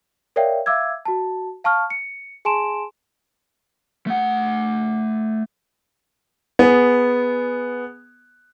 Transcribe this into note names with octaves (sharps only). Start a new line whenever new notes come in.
A#4 C#5 D5 E5 F5 G5
E5 F5 D6 E6 G#6
F#4 A5
F5 A5 C#6 F6
C#7
G#4 G#5 A5 C6 D7 E7
A3 F#5
B3 G#4